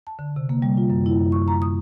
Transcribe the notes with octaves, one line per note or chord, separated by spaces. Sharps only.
A5
D3
C3
A#3
G3
F4
F#2
E4
F#2
C#6
A#5
D#6